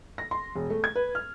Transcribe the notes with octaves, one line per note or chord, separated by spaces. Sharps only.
A#6
C6
E1
A3
G#6
B4
F6